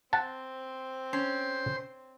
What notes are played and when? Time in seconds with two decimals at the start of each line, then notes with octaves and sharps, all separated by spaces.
0.13 C4 F#5 A5
1.13 C#4 C5